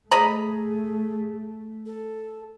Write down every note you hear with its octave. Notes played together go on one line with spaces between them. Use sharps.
A3 G#4 D#5 A#5 B5
A4